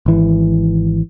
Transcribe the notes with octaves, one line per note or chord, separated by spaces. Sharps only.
G#1 E3